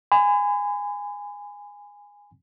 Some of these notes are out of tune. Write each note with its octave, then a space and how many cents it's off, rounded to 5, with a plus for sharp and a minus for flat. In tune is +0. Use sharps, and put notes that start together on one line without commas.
G#5 -15 B5 +40